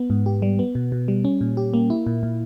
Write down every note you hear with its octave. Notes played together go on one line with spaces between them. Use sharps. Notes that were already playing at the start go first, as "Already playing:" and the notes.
Already playing: B3
G#2
G4
G3
B3
B2
B2
G3
C#4
A#2
G4
A#3
E4
A#2
A#2